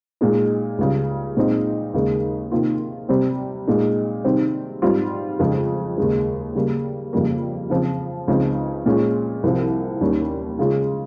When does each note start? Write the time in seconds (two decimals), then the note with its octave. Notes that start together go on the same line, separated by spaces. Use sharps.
0.21 A#2 G#3 D#4
0.78 C#2 C#3 G3
1.37 A#2 G#3 C4 D#4
1.94 D#2 C#3 G#3 D#4
2.52 C3 D#3 A#3 F4
3.09 C3 G3 C4
3.67 A#2 G#3 D#4
4.24 C3 D#3 G3 C4
4.82 G#2 G3 C4 F4
5.39 F2 C#3 G#3
5.98 D#2 C#3 G#3
6.55 C#3 G3 A#3
7.13 F2 C#3 G3 A#3
7.70 C#3 F3 C4
8.28 C#2 C#3 F3 C4 D#4
8.86 A#2 G#3 C#4 F4
9.43 C2 C3 F3
10.01 D#2 D#3 G3 C#4
10.59 C#3 G#3 C#4 F4